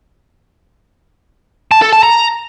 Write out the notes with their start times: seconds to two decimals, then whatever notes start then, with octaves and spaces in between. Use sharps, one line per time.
1.72 A5
1.82 A4
1.93 A5
2.03 A#5